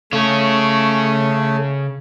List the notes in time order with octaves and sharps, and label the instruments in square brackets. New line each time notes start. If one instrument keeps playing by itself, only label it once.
[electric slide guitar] C#3 C#5 [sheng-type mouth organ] A3